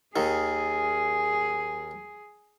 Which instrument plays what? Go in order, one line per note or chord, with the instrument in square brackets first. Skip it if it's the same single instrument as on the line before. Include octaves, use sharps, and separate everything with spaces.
[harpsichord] D#2 D#3 [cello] G#4